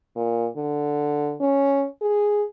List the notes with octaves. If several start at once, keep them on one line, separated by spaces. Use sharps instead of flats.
A#2
D3
C#4
G#4